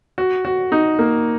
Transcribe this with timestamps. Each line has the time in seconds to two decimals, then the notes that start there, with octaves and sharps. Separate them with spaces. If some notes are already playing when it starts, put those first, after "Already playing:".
0.18 F#4
0.45 F#4
0.72 D#4
0.99 A#3